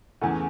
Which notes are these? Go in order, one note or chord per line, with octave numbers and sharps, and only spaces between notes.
E2 C#3 E3 A3 F#5 G#5